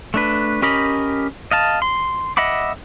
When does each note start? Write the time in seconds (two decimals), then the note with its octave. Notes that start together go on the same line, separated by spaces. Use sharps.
0.14 A3 D4 B4
0.62 C#4 G4 A#4 D#5 B5
1.51 D#5 F5 A5
1.82 C6
2.37 D#5 E5 F#5 B5 D6